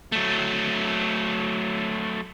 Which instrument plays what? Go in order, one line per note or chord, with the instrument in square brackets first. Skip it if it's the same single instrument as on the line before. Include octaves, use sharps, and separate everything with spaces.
[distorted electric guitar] F#3 A3